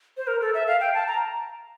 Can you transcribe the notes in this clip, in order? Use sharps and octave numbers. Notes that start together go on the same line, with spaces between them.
C5
A#4
A4
E5
F5
G5
A5
A#5